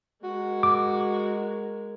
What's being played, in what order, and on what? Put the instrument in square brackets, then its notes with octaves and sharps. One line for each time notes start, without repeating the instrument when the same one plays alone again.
[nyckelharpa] G#3 A#4 [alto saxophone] F#4
[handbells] D6